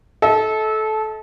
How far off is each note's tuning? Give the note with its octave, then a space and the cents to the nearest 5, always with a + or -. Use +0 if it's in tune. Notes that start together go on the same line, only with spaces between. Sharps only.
A4 -20 D#5 +45